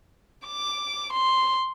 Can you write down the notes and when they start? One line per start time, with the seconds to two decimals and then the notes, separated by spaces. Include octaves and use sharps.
0.46 D6
1.13 C6